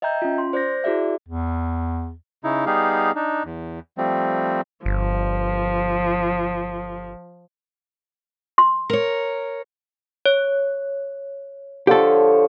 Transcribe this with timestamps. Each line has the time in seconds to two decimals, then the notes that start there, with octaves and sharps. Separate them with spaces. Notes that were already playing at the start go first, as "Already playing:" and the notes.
0.02 D#5 E5 G5 A#5 G6
0.22 C#4 F4
0.38 C6
0.53 C5 D5 G6 A#6
0.84 E4 F#4 G#4 D5 E5
1.28 E2
2.44 C#3 D#4 E4
2.66 G3 B3 D#4 G4 G#4 F5
3.16 D4 D#4
3.45 E2
3.98 F3 G3 A3 C4
4.85 G1 F3
8.58 C6
8.90 A#4 C#5
10.26 C#5
11.87 D3 F3 G4 A4 C#5